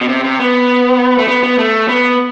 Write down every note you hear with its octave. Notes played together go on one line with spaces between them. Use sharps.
B2
C3
C3
B3
A3
B3
B3
A3
B3